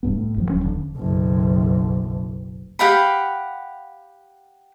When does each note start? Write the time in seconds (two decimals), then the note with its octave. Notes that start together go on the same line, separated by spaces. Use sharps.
0.03 D1 C2 G2 B3
0.15 A2
0.37 G1 F#2 D#3 F3
0.50 D1 F3 F#3 C#4
0.64 F1 E2 D3
0.97 F#1 B1
2.79 G4 F5 F#5 B5